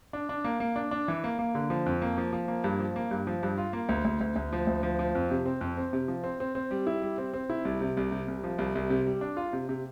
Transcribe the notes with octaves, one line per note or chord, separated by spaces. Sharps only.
D4
D4
A#3
A#3
D4
D4
E3
A#3
A#3
D3
F3
F2
A#3
F3
F3
A#3
G2
F3
A#3
G2
F3
G2
F4
A#3
D2
D2
D2
D2
F3
D2
F3
F3
F2
C3
C4
F2
C4
C3
F3
C4
C4
C4
G3
E4
G3
C4
C4
E4
C2
C3
C2
C3
C2
F3
C2
C2
C3
G3
D4
F4
C3
C3